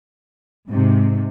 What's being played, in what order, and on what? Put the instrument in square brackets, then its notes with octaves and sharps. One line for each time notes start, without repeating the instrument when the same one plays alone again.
[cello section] G#2 C3